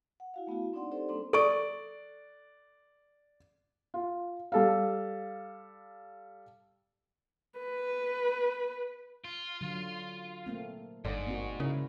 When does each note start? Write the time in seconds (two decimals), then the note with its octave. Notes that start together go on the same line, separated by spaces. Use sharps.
0.20 F#5
0.34 E4 F#4 F5
0.47 A3 B3 E4 F#4
0.73 C4 D4 D#4 D5 F#5 C6
0.92 C4 D#4 G4 A4 C5 D5
1.09 G3 A#3 C4 D4 A4 C6
1.33 A4 D5 C#6 D7
3.94 F4
4.52 G3 A4 F5
7.59 B4
9.24 F4
9.61 D3 F#3
10.46 A3 A#3 C4
11.05 G1 G#2 D5
11.26 A#3 C4 F#4
11.60 C#3 E4 A#4